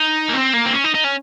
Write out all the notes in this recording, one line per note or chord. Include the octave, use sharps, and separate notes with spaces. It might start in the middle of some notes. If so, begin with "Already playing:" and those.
Already playing: D#4
A#3
C4
A#3
C4
C#4
D#4
D#4
C#4